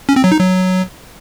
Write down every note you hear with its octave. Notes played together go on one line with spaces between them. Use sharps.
C#4
C4
F#3
D#4
F#3